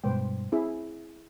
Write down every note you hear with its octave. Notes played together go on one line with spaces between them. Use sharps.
G2 B2 G#3 B4 C5 G5
C4 E4 G#4 E5